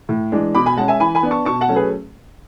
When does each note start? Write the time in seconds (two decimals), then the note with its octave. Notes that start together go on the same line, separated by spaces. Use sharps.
0.09 A2
0.32 E3 G#3 D4
0.55 B2 B5 D6
0.66 G#5 B5
0.77 G#3 C#4 F#5 A5
0.88 E5 G#5
1.00 E3 G#5 B5
1.15 G#5 B5
1.23 B3 D4
1.31 A5 C#6
1.45 B2 A5 C#6
1.61 F#5 A5
1.69 F#3 A3 C#4
1.76 G#4 B4